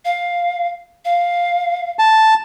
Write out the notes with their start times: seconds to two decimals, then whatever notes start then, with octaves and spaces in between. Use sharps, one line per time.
0.05 F5
1.05 F5
1.99 A5